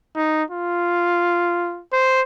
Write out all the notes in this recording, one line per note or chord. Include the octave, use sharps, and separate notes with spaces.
D#4
F4
C5